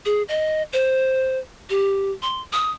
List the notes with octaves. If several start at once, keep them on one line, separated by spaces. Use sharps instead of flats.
G#4
D#5
C5
G4
C6
D#6